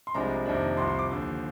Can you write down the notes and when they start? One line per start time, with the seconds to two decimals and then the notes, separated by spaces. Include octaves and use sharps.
0.07 C6
0.14 C2 C3 F3 G#3 D4 A#5
0.46 F2 C3 D#3 A#3 D4
0.77 C2 C3 F3 C6
0.88 C6
0.99 D6
1.09 D#2 D3 F3